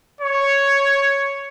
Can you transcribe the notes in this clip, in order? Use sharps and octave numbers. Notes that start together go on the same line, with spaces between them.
C#5